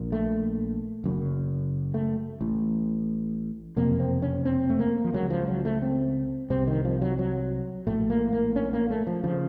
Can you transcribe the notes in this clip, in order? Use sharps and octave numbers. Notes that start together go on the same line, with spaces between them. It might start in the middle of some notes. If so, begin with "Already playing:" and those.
Already playing: A#1 A#2
A3
F#1 F#2 C#3
A3
A1 A2
F#1 F2 C3 A#3
C4
C#4
C4
A3
A#3
F3
C#2 C#3 F#3
F3
F#3
A3
C4
C2 C3 C4
D#3
F3
F#3
F#3
A#1 A2 A3
A#3
A#3
C#4
A#3
A3
F3
C#3 F3